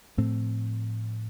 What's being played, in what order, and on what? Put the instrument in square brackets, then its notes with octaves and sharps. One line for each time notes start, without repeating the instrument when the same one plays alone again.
[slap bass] A2 F3 A3 C4